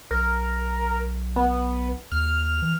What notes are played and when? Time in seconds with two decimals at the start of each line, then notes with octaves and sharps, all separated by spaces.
0.11 B1 A#4
1.36 B3
2.12 D#2 F6
2.62 E3